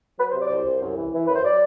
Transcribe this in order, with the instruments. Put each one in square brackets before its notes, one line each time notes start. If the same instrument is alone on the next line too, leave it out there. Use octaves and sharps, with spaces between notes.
[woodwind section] F#3 B4
C5
C3 D5
D5
C2 C5
C2
F#2
E3
E3
F#2 B4
C5
F#3 D5